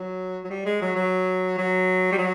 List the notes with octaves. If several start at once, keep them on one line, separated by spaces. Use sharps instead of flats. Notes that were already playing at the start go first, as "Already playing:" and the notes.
Already playing: F#3
F#3
G3
G#3
F#3
F#3
F#3
G3
F#3